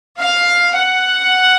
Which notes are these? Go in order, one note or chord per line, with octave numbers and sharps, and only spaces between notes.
F5
F#5